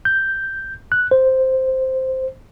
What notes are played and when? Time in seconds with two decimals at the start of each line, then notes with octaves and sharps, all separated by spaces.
0.05 G6
0.92 F#6
1.11 C5